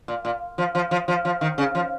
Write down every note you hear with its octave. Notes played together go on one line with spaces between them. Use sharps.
A#2
A#2
F3
F3
F3
F3
F3
D#3
C#3
F3